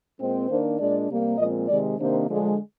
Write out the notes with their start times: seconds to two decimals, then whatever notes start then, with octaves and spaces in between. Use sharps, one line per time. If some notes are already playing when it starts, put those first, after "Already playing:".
0.20 A#2 G#3 C4
0.49 D#3 A#3 D4 C5
0.79 A#2 G#3 D4 D5
1.09 C3 G3 A#3
1.38 A#2 F3 G#3 C4 D#5
1.69 C3 D#3 G#3 D5
1.99 C3 D#3 A#3 D4 C5
2.27 D3 F3 G#3 D4